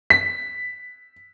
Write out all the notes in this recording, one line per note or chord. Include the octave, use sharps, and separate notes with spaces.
B6